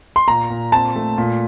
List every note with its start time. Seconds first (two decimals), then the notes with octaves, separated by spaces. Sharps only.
0.16 C6
0.28 A#2 A#5
0.50 A#2
0.72 C4 A5
0.96 A3
1.18 A#2